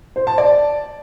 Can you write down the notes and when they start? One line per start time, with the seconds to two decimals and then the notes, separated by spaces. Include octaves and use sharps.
0.16 C5
0.27 A5
0.38 D5